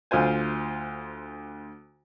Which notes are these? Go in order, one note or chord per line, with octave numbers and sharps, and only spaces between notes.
D2 F4 C5 G#5